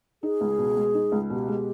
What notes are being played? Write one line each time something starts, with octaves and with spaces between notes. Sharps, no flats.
D#4 G#4
C#2
B2
G#3
D#4
C#2
B2 G4
G#3